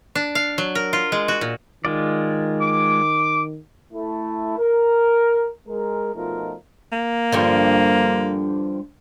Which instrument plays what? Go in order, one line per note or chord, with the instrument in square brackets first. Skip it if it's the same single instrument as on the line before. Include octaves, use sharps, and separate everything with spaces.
[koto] D4
F5
F#3
A#4
F4
G#3
F#4
A#2
[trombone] D#3 [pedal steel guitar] G#3 F4 D5
[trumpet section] D6
[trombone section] A3 E4
A#4
G#3 A#4
B2 F3 A3 D#4 F4 A#4
[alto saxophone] A#3
[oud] G2 D3 F3